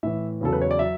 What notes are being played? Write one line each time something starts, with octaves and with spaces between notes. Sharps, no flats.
A2 E3 E5
E2 C#3 F#3 A4
B4
C#5
D5
F#3 E5